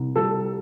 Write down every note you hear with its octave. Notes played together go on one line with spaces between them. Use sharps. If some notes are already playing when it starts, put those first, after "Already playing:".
Already playing: C2
G3 A4